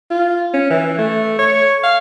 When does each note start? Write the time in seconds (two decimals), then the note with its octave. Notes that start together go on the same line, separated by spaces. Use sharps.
0.10 F4
0.53 C#4
0.70 E3
0.98 A3
1.39 C#5
1.83 F5